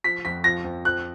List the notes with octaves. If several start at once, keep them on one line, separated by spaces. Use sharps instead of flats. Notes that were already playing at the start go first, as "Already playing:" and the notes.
F3 B6
F2 B6
F3 A#6
F2
F3 F#6